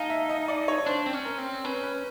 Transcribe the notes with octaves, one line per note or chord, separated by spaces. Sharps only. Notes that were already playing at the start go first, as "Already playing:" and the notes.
Already playing: D#4 F5 G#5 A5
E5
D#5
D5
C#5
D4 C5
C4
C#4
A#4
C4
C#4 B4
B4